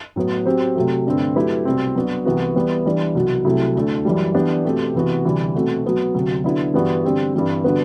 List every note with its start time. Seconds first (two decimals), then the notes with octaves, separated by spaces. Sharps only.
0.16 A2 F#3 B3
0.46 F#3 C4 G4 C5
0.75 C3 F#3 A3
1.07 G2 D3 A3 C4
1.36 F#3 A3 E4 G4 B4
1.65 C2 B2 G3 C4
1.95 F#3 B3 D4 F#4
2.25 C2 C3 E3 B3 F#4
2.56 E3 G3 B3
2.85 E3 G3 D4
3.15 C2 B2 F#3
3.45 C2 C3 F#3 A3 E4
3.75 D2 D3 A3
4.05 F#2 E3 G3
4.34 E3 B3 D4 G4 D5
4.64 B2 A3 C4 G4
4.94 C3 E3 B3 F#4
5.24 D2 C3 E3 G3
5.55 B2 A3 C4 F#4
5.85 F#3 B3 F#4
6.15 D2 C3 F#3
6.44 D3 F#3 B3 E4
6.74 G2 E3 G3 B3 F#4
7.04 D3 G3 C4 G4
7.34 G2 E3 G3 C4
7.64 D3 G3 B3 F#4 B4